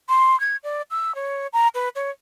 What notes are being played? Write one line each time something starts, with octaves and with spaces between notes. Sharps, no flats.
C6
G#6
D5
E6
C#5
A#5
B4
C#5